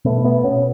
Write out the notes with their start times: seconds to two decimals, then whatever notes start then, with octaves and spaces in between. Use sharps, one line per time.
0.05 B2 A3 B3
0.24 A3 B3
0.44 B2 B3 C#4